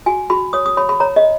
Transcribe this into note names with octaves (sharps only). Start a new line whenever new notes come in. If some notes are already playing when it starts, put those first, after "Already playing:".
F#4 G#5
F#4 B5
C#5 D#6
D#6
C#5 B5
B5
C#5 A#5
D#5